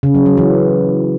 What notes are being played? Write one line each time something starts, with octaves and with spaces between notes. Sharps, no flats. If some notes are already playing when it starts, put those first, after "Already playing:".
C#3
F#3
F#3
E3